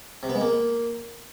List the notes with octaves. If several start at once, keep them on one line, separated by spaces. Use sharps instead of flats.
C3
B3
G#3
A#3